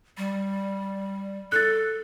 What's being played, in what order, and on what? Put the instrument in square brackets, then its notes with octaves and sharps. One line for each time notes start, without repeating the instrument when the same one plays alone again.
[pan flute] G3
[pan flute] A4 [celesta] F#6 A6